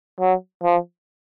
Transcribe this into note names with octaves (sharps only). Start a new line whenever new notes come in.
F#3
F3